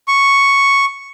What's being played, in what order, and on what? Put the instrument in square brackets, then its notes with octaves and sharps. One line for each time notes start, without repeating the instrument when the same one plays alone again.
[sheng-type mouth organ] C#6